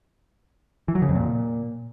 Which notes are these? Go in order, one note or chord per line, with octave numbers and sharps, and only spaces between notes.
E3
F#3
C#3
F2
A#2